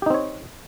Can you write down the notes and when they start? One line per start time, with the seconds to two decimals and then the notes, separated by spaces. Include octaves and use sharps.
0.02 G4
0.06 D#4
0.10 C4
0.14 C#5